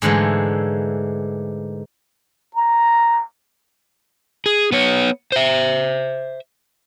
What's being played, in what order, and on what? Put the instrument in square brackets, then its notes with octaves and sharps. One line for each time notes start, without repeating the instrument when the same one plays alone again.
[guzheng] G#2 D3 E3 G#3 A3
[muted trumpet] A#5
[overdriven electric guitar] G#4
B3 C#5
C5 E5